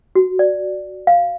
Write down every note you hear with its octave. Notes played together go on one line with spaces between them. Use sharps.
F#4
D5
F5